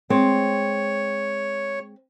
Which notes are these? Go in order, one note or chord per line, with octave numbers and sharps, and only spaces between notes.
G#3 C4 C#5